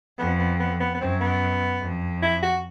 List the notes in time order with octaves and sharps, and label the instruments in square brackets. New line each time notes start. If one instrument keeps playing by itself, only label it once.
[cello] F2 [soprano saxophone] B3
[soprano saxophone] B3
B3
B3
B3
[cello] F#2 [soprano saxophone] C4
[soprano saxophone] B3
[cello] F2
[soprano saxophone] E4
F#4